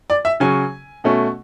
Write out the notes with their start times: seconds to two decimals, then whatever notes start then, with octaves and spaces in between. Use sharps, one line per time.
0.10 D5
0.25 E5
0.40 C#3 F#3 C#4 G#5
1.04 B2 A3 C#4